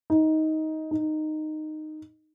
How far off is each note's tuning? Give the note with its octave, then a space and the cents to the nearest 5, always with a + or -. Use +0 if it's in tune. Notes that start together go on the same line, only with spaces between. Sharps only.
D#4 +15
D#4 -10